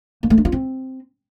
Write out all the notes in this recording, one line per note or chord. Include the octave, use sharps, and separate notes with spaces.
A#3
A3
D#4
F4
C4